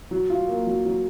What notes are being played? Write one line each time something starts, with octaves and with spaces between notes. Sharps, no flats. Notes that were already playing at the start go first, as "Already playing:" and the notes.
F#3
F4
A#3
F#3
F#3